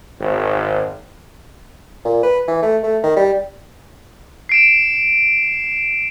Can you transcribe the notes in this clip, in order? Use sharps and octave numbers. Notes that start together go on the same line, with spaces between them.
G#1
A#2
B4
E3
A3
A3
D#3
G3
C7 D7 E7